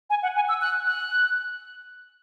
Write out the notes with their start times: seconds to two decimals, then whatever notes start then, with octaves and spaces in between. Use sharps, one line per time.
0.10 G#5
0.23 F#5
0.35 G#5
0.49 E6
0.61 F#6
0.86 F#6